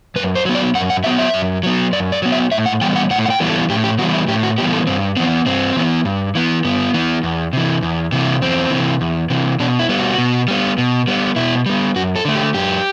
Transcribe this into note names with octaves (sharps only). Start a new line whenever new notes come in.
F#2 B4
C5
F#3 B3
D5
F#2 F#5
F#5
F#3 B3 E5
E5
F#2
F#3 B3
F#2 D5
D5
F#3 B3
E5
A2 E5
F#5
E3 G3 B3 G5
F#5
A2 F#5
F#5
G5
E3 G3 B3
A4
A2 G4
G4
E3 G3 B3 F#4
E4
A2 G4
F#4
E3 G3 B3 G4
A4
G2 C4
E3 B3 C4
G2 C4
E3 B3
G2
E3 B3
G2 B3
E3 B3
E2
C3 E3
E2
C3 E3
E2 C4
C3 E3
E2
C3 E3
B2 D4
E4
G3 B3
F#4
B2
G3 B3
B2
G3 B3
B2 E4
G3 B3
F#2 F#4
A4
D3 A3
G4
F#2 G4